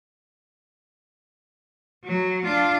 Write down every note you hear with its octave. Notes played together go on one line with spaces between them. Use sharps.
F#3
D4 F4